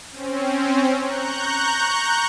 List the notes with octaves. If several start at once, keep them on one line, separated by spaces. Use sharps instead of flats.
C4 C#4
A#5 C#6 F#6 G6